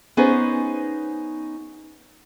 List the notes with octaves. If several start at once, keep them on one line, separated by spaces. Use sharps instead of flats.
B3 C#4 D#4 G#4 B4 C5